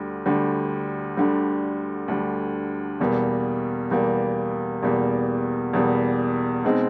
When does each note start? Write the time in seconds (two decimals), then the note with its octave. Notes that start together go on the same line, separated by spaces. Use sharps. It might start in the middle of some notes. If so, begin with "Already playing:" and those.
Already playing: D2 D3 G3
0.26 D2 D3 G3
1.17 D2 D3 G3
2.08 D2 D3 G3
3.00 E2 B2 G3 A#3
3.91 E2 B2 G3 A#3
4.83 E2 B2 G3 A#3
5.73 E2 B2 G3 A#3
6.64 B2 G#3 C4 D#4